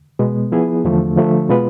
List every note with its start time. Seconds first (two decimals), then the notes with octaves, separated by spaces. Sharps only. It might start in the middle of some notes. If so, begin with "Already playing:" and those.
0.19 B2 G#3 B3
0.52 F3 B3 E4 G#4
0.84 E2 D3 F3 A3
1.16 D3 F3 A3
1.49 B2 G#3 B3 F4 B4